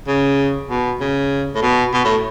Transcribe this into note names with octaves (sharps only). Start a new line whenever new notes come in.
C#3
B2
C#3
A2
B2
B2
A2